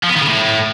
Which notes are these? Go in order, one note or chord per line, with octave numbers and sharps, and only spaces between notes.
F3
B3
D#3
C#3
A2